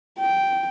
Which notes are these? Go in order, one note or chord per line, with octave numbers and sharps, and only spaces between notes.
G5